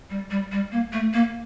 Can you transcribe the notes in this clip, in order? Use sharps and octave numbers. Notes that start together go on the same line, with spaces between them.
G3
G3
G3
A#3
A3
A#3